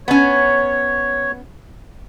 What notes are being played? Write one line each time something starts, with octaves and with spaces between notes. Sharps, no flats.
B3 C#4 C#5